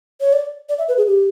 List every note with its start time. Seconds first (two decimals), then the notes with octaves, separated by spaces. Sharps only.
0.21 C#5
0.33 D5
0.69 D5
0.78 E5
0.88 B4
0.97 G#4
1.07 G4